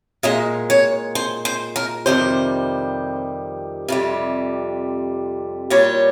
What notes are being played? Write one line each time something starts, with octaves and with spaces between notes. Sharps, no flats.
A#2 G#3 D#5
C#5
C5
C5
A#4
F2 C3 D#3 G3 C5
F2 C3 G3
A#2 G3 C#5